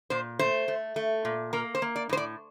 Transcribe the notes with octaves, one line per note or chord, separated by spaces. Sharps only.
A#2 C5
A3 C5
A3
A3
A#2
A#3 A#4
C5
A#3
D5
A2 C5
D5